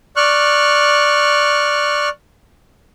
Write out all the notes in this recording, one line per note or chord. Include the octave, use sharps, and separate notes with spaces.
D5 C#6 F6 F#6